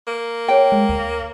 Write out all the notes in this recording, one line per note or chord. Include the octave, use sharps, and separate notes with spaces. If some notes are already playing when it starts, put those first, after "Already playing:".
A#3
G#4 C#5 G5
G#3
D2